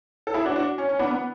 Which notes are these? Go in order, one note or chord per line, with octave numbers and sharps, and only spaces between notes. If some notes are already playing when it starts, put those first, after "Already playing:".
A4
E4 G#4
D4 F#4
D4 F#4
C#4
C#4
B3 D4
B3